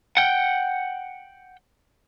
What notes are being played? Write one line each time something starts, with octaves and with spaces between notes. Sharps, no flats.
F#5 G5